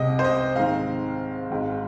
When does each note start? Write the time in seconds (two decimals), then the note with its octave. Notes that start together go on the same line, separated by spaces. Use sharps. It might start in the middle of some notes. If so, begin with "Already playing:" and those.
Already playing: C2 C3 G#3 D#5
0.19 C5
0.24 D#5
0.56 G#2 D#3 C4 F5
1.50 G#1 G#2 G#3